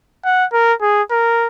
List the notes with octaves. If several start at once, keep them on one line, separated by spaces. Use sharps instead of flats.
F#5
A#4
G#4
A#4